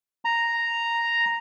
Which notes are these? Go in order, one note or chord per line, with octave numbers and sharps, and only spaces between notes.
A#5